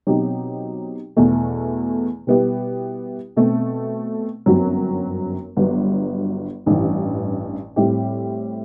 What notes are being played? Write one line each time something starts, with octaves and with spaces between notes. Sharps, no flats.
B2 F#3 C4 D#4 G4
E2 B2 A3
B2 G3 B3 E4 G4
B2 A3 C4
G1 F#2 F#3 C4 F#4
G1 G2 F#3 B3
A1 G2 E3
A2 G3 C4 E4 G4